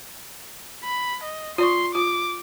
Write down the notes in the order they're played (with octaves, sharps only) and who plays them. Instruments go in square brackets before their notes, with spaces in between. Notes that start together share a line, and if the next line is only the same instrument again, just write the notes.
[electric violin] B5
D#5
[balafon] F4 D5 C#6 [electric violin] C6
[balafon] F4 [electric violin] D6